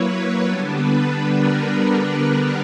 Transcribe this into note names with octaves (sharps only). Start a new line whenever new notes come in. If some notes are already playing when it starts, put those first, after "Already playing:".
Already playing: F#3 A#3 E4 B4 C#5
C#5
D3 G3 B3 D4 D5
B4
B4
A#4